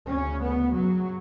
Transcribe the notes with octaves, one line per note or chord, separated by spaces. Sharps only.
D2 C#3 C#4
B3
F#2 C#3 F#3